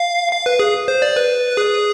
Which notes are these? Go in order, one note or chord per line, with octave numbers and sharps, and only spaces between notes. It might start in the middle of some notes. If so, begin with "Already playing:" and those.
Already playing: F5
F5
B4
G#4
C5
D5
B4
G#4